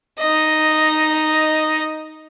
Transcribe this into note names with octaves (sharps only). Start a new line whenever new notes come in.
D#4 D#5